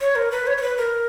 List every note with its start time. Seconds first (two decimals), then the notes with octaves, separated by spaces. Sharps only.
0.01 C#5
0.15 A#4
0.32 B4
0.47 C#5
0.57 C#5
0.62 B4
0.78 A#4